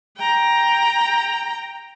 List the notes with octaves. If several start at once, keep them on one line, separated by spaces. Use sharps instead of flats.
G5 A#5